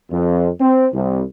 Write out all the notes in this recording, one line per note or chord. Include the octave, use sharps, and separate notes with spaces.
F2
C4
C2